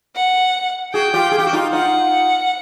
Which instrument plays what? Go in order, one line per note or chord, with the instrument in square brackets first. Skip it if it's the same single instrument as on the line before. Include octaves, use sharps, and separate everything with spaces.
[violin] F#5
[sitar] F#4 G#4 [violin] G5
[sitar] F4 G4
G#4
G4
F#4
D#4 F4
[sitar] D#4 F4 [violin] F#5